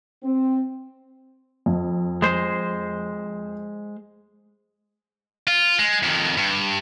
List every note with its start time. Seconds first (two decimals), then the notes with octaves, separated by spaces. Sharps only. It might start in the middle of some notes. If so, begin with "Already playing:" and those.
0.23 C4
1.66 F2
2.22 G#3 C5
5.48 F4
5.79 G#3
6.03 F2 D#3
6.38 G2